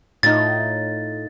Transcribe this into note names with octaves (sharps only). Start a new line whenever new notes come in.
A2 D#4 F4 A6